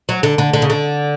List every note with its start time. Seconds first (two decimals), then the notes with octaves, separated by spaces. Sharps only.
0.09 F#3
0.23 D3
0.38 D3
0.53 D3
0.62 C#3
0.70 D3